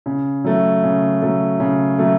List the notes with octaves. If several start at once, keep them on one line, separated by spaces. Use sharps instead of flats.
C#3
F#3 A3
C#3
F#3 A3
C#3
F#3 A3